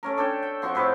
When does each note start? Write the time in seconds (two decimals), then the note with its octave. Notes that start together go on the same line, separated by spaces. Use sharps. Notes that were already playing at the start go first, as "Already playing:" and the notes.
0.03 A3 C#4 A#4
0.17 D4 A4 C#5 G5
0.43 G5
0.62 F3 C4 F#4 C#6
0.75 A2 C3 B4 D#5